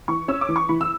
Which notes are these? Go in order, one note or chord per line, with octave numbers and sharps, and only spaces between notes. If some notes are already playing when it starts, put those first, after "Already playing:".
E3 C#6
C#4 E6
D6
E3
C#6
E3 B5
E6